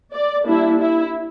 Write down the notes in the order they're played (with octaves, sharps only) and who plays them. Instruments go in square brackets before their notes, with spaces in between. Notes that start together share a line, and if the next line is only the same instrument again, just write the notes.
[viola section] D5
G3 A#3 D4 E4
E4